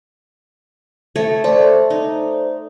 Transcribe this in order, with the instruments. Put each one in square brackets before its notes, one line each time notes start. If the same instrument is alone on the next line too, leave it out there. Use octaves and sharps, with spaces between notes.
[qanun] A3 C#5 D#5
[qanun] A3 [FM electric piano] A4 C5 D5
[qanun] D#4